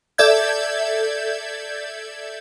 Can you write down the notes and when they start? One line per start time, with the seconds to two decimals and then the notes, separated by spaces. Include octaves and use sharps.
0.18 A4 D5 E5 G6 G#6